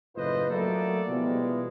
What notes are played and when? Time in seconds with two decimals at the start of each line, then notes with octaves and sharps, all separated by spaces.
0.16 F#1 A2 F4 B4 C5 D#5
0.50 F#3 A3 A#3 F#4 A4 D5
1.09 B2 E3 F3 G3 G#3